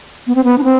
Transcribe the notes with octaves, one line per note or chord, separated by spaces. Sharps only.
B3
C4
B3
D4
C4